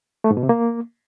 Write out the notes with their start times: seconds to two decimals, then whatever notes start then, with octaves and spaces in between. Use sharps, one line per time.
0.24 A3
0.31 G#2
0.37 B2
0.43 C3
0.49 A#3